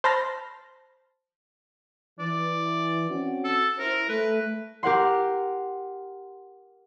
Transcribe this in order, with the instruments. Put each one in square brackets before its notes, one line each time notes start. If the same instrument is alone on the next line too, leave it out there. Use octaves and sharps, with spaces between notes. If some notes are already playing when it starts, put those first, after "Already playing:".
[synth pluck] C5 A5 B5 F6 A#6
[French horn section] E3 [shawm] D5
[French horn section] C4 C#4 F#4
[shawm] A4
[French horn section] E4 C5 [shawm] A#4
[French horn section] A3 [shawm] B4
[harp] G4 A#4 F#5 C6